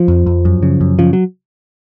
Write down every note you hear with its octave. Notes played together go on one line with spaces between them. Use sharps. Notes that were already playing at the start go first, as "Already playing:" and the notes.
Already playing: F3
F2
F2
F#2
C#3
F#2
C#3 F3
F#3